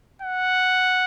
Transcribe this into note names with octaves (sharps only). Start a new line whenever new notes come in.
F#5